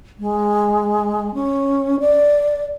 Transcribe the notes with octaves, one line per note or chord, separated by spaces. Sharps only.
G#3
C#4
D5